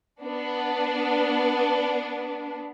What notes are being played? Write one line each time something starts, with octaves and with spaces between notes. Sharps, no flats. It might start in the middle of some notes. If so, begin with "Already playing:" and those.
B3 D4